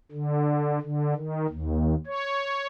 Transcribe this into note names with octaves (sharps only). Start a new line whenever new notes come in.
D3
D3
D#3
D#2
C#5